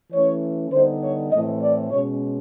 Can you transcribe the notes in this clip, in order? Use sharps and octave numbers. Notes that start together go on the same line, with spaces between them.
E3 A3 C#4 C#5
D3 G3 B3 D#4 C5
C#5
A2 E3 A3 C4 D#5
D5
B2 G#3 C#4 C#5